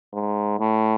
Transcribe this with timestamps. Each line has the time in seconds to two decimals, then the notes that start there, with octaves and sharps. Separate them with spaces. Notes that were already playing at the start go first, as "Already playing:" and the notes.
0.13 G#2
0.60 A2